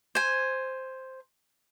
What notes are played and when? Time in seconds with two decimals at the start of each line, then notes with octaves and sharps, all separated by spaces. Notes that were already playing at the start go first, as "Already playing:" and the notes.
0.15 C5 G#5